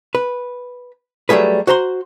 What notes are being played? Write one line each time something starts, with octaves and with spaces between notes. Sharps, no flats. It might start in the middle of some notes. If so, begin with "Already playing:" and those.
B4
F#3 G3 A3 G#4 B4
F#4 C5 A#5 C6